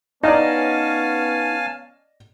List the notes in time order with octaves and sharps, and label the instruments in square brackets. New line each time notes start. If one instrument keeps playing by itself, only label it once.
[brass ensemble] B3 C#4 [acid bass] D#4 [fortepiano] D5 D#5 [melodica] F5 G#5 A5